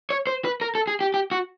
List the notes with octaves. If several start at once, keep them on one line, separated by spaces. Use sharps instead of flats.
C#5
C5
B4
A#4
A4
G#4
G4
G4
F#4